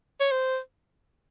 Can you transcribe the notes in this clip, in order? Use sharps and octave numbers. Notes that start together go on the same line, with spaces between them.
C#5
C5